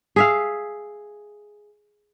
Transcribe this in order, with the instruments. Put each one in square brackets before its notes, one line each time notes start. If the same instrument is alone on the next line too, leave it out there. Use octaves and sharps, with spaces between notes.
[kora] G#4 E5 F5